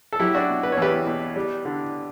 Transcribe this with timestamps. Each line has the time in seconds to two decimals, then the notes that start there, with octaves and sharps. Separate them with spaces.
0.12 A4
0.20 F#3 E4 G4
0.34 D4 F#4
0.49 B2
0.63 B4
0.72 C#5
0.77 E2 G4 B4
1.06 B2
1.36 G3
1.65 D3